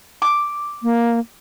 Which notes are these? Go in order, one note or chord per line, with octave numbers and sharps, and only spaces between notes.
D6
A#3